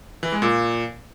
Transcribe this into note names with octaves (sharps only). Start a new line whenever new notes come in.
E3
G#3
A#2